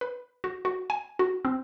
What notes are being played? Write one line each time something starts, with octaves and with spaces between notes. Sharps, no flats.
B4
F#4
F#4
G#5
F#4
C4